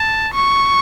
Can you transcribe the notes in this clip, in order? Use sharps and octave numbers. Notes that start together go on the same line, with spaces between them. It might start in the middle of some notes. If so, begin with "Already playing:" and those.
Already playing: A5
C#6